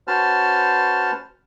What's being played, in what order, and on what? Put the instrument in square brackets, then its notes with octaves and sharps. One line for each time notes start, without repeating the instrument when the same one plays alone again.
[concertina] C#4 F#4 B4 C5 A5 F6